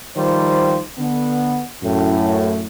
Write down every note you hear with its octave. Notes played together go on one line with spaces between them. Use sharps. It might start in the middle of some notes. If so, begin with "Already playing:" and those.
D#3 F3 G3 F4 C5
D3 B3
F#2 A2